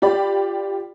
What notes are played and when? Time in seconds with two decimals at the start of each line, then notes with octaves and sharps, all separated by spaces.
0.02 F4 G4 D5 B5